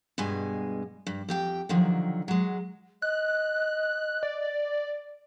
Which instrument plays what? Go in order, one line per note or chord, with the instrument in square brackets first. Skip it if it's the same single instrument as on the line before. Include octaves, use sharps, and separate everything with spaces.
[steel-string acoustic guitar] G2 B2 G#3 G#5
G2
F2 G4 G5
D3 D#3 F3 F#3
F#3 G#3
[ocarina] D#5 [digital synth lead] F#6
[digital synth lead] D5